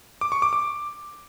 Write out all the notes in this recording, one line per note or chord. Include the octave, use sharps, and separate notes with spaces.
D6
C#6
D6
D6